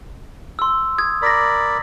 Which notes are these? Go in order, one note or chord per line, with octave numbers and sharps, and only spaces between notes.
C6 E6
D#6 G#6
A#4 D5 B5 D#6 A#6